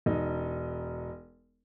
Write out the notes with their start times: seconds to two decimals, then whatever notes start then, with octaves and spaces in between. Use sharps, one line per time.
0.06 E1 D#4